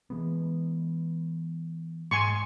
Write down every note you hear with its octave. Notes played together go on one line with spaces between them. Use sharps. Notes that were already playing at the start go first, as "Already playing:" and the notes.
E3 G#3 B3
G#2 G#3 G#5 C6 C#6